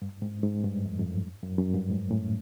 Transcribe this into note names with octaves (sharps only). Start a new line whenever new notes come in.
G2
G#2
G#2
G2
F2
F2
F#2
F#2
F#2
G2
G#2
A2